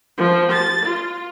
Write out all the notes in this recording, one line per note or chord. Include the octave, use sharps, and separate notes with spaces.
F3
A6
F4